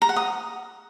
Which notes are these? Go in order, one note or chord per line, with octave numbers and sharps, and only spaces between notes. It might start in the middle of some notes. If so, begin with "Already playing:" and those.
A#5
F#5
D#6